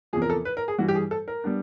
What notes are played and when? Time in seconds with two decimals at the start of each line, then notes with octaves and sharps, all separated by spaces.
0.13 E2 C3 F3 G#4
0.22 A#4
0.30 A4
0.45 B4
0.57 A#4
0.68 G#4
0.78 G2 E3 G3 F#4
0.88 G4
0.95 G#4
1.11 A4
1.28 A#4
1.44 G3 B3 D4